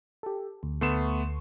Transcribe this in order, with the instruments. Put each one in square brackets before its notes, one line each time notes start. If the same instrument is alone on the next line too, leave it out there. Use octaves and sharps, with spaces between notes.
[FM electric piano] G4 A4
D2
[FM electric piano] D2 C6 C#6 [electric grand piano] A3 B3 E7